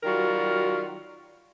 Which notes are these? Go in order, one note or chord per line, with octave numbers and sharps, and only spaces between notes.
D#3 F#3 G3 F4 F#4 A#4